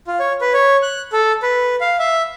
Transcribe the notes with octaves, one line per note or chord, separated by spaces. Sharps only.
F4
C#5
B4
C#5
F#6
A4
B4
F5
E5